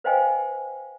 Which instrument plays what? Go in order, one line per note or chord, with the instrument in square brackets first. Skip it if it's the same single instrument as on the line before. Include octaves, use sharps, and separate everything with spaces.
[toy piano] B4 C5 D#5 F5 G5 G#5